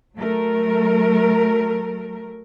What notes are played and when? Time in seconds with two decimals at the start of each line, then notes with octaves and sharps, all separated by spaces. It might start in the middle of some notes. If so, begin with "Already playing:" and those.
0.16 F#3 A3 A#4